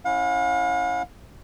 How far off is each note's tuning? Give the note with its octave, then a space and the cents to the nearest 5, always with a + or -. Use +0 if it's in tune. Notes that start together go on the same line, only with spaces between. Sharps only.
C#4 -20 E4 +0 F5 +45